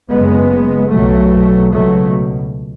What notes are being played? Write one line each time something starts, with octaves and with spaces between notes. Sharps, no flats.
F#1 F#2 C#3 G#3 B3
B1 B2 F#3 A3
C#2 B2 F#3 A3